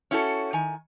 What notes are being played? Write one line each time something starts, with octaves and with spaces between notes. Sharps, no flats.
C#4 E4 F#4 G4 A4
D#3 G#5